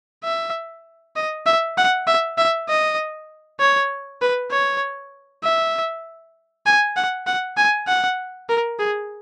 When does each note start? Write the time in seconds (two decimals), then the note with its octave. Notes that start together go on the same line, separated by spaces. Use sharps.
0.24 E5
1.16 D#5
1.46 E5
1.77 F#5
2.07 E5
2.38 E5
2.69 D#5
3.60 C#5
4.21 B4
4.51 C#5
5.43 E5
6.66 G#5
6.96 F#5
7.27 F#5
7.57 G#5
7.88 F#5
8.49 A#4
8.79 G#4